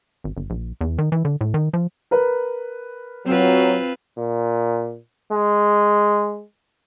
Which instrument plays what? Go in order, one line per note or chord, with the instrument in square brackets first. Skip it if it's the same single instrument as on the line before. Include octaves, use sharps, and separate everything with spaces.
[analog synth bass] G#1
G1
A#1
E2
D#3
E3
D3
A2
D#3
F3
[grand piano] A#4 B4
[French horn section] F#3 [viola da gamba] C4 F4 B4
[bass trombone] A#2
G#3